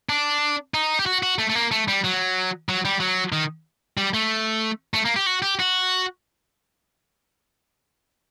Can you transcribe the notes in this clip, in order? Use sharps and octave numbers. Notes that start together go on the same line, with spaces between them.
D4
D#4
G4
F#4
F#4
A3
A3
A#3
A3
G3
F#3
F#3
G3
F#3
D#3
G3
A3
A3
A#3
G4
F#4
G4
F#4